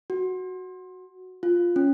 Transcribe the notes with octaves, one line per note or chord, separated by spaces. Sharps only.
F#4
F4
C#4